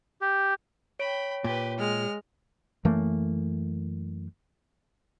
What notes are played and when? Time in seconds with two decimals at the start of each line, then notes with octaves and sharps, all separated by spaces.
0.21 G4
0.99 C#5 G5 B5 D7
1.44 A#2 G4 B4
1.78 G#3 F6
2.85 F#2 E3 A3 A#3